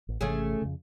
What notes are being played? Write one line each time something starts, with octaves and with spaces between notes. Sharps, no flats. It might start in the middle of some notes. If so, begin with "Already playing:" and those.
A1
G#1 C3 E3 A3 C#4 G#4
F2 C#3